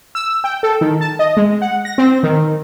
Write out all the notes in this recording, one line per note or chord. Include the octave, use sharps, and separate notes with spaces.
E6
G5
A4
D#3
A5
D#5
G#3
F#5
A#6
C4
D#3